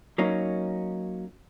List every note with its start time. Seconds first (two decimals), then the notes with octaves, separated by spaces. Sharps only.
0.18 F#3 A#3 C#4 D#4